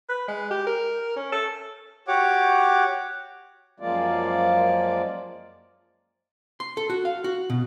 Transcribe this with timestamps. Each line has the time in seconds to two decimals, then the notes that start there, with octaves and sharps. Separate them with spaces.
0.09 B4
0.28 G#3
0.51 G4
0.67 A#4
1.16 C#4
1.32 A4
2.08 F#4 G4 C#5 F#5 D6
3.80 F#2 F3 G#3 A#3 F4 D5
6.60 C6
6.77 A4
6.90 F#4
7.05 F5
7.24 F#4
7.50 B2